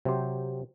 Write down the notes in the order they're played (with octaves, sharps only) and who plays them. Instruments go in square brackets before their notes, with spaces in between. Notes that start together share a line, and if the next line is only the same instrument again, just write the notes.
[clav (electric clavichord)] C3 F#3 C4 G4 C5